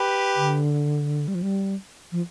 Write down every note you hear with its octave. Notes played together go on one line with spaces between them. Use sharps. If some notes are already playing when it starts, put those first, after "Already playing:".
Already playing: G4 B4
D3
G3
F3
G3
F3